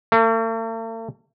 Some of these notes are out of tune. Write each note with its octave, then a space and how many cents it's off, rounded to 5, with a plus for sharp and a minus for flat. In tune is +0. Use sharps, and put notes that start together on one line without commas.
A3 +45